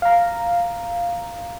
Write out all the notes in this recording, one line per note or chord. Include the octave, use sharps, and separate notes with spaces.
F5 A#5